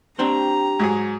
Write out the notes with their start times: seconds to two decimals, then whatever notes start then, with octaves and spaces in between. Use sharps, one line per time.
0.19 C4 D4 G4 C5 A#5
0.79 G#2 F#3 G#4